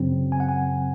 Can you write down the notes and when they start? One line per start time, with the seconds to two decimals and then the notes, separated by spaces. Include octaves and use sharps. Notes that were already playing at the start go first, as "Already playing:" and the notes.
Already playing: F#2 C#3 F#3 C4
0.32 G#5
0.40 F#5
0.49 G#5